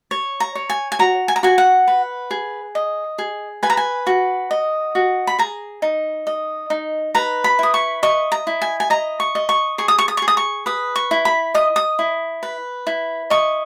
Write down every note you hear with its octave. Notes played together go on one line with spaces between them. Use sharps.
C#5
A#5
C#5
G#5
G#5
F#4 A#5
G#5
A#5
F#4 G#5
F#5
B4
G#4
D#5
G#4
B4 G#5
A#5
G#5
F#4
D#5
F#4
B5
G#4 A#5
D#4
D#5
D#4
B4 A#5
B5
E4 D#6
C#6
D#5 C#6
A#5
E4
G#5
G#5
D#5 A#5
C#6
D#5
C#6
G#4 C#6
D#6
C#6
D#6
G#4 C#6
D#6
C#6
B4 D#6
C#6
E4
B5
D#5 D#6
D#6
E4
B4
E4
D#5 C#6